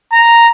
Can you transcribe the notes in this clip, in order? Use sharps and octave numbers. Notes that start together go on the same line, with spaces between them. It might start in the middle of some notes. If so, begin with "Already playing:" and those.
A#5